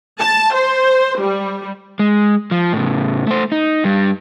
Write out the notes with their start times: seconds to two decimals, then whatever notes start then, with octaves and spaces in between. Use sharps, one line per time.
0.20 A5
0.54 C5
1.20 G3
1.99 G#3
2.51 F3
2.73 A2 C#3
3.27 A3 C5
3.52 D#4
3.84 G2 G3